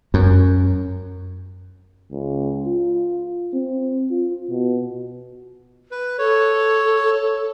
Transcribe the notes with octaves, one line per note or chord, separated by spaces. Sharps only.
F#2
C#2
F4
C4
F4
B2
B4
A4 C#5